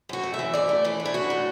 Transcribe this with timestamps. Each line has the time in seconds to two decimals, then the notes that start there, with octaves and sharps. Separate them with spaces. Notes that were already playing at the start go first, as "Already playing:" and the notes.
0.09 F#2 F#4
0.24 A3
0.34 E5
0.39 E3
0.53 F#2 D5
0.69 A3
0.85 E3 D5
1.00 D4
1.05 E4
1.14 F#2 F#4
1.30 A3